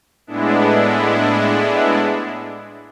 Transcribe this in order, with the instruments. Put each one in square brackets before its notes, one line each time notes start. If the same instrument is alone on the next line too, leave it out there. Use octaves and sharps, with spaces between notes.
[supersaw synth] A2 G#3 B3 D4 E4